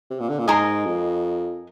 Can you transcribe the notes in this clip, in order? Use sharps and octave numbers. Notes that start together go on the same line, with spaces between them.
C3
A#2
D3
A#2
G#2 A#4 D#5 G#5 C6
F2